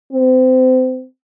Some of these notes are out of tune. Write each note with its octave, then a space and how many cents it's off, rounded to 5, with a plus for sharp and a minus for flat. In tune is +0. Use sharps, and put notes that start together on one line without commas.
C4 -30